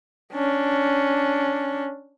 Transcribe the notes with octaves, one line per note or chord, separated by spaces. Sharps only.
C#4 D4